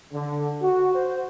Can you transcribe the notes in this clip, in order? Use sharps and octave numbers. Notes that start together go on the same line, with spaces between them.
D3
F#4
C5